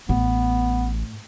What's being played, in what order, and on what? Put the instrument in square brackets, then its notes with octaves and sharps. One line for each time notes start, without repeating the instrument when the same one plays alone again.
[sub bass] A1 [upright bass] A2 [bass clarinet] B3